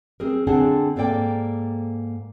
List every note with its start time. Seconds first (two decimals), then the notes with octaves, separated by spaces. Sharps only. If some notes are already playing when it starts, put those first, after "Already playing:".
0.20 C4 G#4 A#4
0.47 D3 C4 D4 G#4 F#5 A5
0.96 G#2 A#3 A4 D5 G5